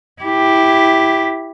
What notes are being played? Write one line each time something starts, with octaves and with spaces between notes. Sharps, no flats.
E4 G4